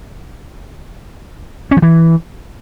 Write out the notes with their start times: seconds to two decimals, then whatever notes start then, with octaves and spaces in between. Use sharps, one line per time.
1.71 C#4
1.77 F3
1.82 E3